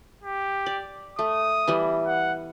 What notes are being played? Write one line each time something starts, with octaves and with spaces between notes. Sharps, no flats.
G4
D5
A3 D#6
E3 G3 B3
F#5